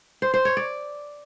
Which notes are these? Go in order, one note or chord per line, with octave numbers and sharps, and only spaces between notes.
C5
C5
C#5
D5